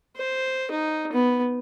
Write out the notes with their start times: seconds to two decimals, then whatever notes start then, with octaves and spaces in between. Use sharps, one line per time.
0.16 C5
0.71 D#4
1.13 B3